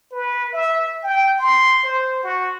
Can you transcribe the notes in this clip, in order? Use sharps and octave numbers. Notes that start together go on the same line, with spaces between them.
B4
E5
G5
C6
C5
F#4